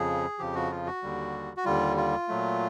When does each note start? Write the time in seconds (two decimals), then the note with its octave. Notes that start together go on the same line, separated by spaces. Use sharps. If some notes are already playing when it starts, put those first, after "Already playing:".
Already playing: F2 C#3 F3 G#4
0.39 F2 C#3 F3 G4
0.55 F#4
0.71 F4
0.87 F#4
1.03 D#2 D3 G3
1.57 F#4
1.65 D#2 D3 G3 F4
1.97 F4
2.28 A#2 F#3 A3